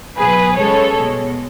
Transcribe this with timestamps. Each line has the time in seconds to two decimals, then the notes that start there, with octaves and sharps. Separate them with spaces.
0.17 B2 F#3 G#4 B4
0.56 C#3 G#3 A4 C#5
0.97 B2 G#3